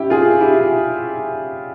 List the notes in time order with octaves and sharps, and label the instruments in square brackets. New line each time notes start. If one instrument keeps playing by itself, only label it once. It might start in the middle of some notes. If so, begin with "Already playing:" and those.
Already playing: [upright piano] C#4 E4 G4
F4 G#4
E4 G4